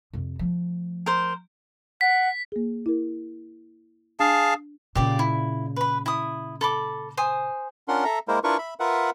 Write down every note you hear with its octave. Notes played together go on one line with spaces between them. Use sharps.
F2 C3
F3 A3
A#4 C5
F#5 B6
A#3 G#4
E4 A#4
D4 G#4 F5 A5
A#2 C#3 G4 D5
E4
B4 B5
E4 D#6
A4 B5 D6
C5 G#5 D#6
C#4 D4 F4 A#4 F#5 C6
A4 E5 A#5
G#3 A#3 E4 A#4 C5
D4 E4 F4 A#4 B4 C#6
E5 B5
F4 A#4 B4 E5 F#5